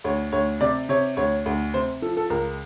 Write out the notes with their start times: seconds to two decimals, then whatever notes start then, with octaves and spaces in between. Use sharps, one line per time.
0.04 D2 C#5
0.32 D2 C#5
0.61 C3 D5
0.89 C3 C#5
1.17 D2 C#5
1.46 D2
1.74 C3 C5
2.02 F3 A4
2.17 A4
2.30 C#2 A#4